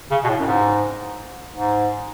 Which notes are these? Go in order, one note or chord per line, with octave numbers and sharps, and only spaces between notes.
C#3
B2
A2
F#2
G#2
G#2